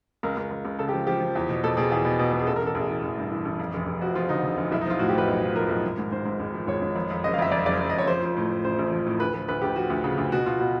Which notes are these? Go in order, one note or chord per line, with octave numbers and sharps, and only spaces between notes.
C#2 A#4
C#2
C#2
C#2
C#3 A4
G4
F3
F3 G4
F3
E2
B2
B2 A4
B2 G#4
E2 G#4
B2
B2
B2
G#4
A1 A4
A#4
A1
A4
A1 G#4
E3
A1
G2
E3
A1
F2
F1
F1
F3 F#4
F3 F4
D3 D#4
D3
F1
B1 E4
D#4
F3 F4
A2 F#4
G4
F3 B4
B1
F3
F3 A#4
B1
G#1
G#2
G#2 C5
G#2
G#1
F3
G#1 C#5
G#1
F2
F2
F#1 D#5
F5
F2 E5
F2 D5
F#1 D5
F#1
D#5
F2 C#5
F3 C5
F3
A2
A2
A1 C5
A1
F3
A2
D2 B4
F3 B4
D2 B4
D2 G4
F3 F#4
D2
C#3
D2
B2 F#4
B2 F4
B2 F#4